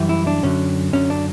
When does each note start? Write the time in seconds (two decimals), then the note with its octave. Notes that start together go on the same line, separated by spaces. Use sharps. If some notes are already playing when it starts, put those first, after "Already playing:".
Already playing: F#2 E3 G3
0.09 E4
0.27 D4
0.43 F#2 D3 F#3 C#4
0.93 F#2 D3 F#3 C#4
1.10 D4